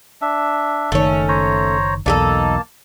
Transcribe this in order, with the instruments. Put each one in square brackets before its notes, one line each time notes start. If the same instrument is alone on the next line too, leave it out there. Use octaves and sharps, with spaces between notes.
[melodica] D4 E5
[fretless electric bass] F#1 D#3 [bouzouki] A3 C#4
[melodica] C5 C#5 A#5
[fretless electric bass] B1 E2 [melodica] A#3 A5 [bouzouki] D#4 G#4 A4